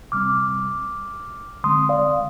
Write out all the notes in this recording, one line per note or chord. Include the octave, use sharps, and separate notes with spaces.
C3 G3 C4 D6 F6
D3 G#3 C4 C6 D#6
D5 F5